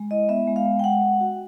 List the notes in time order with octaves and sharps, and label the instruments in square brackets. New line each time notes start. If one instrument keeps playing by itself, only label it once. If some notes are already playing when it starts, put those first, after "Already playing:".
Already playing: [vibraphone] G#3
E4 D#5
B3 E5
G#3
F5
G#3
G5
G#3 F#5
G#3
F#4